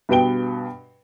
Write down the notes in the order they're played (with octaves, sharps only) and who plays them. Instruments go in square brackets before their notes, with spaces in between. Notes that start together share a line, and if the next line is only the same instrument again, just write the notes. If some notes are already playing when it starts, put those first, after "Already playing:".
[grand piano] G2 B2 B4 G5 D7 G7